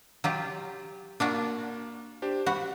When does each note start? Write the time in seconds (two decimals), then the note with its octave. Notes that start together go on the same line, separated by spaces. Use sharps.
0.24 F#3 F4 G4
1.20 A#3 D4 F4 F#4
2.22 D4 G4 C5
2.46 F#4 F#5 B5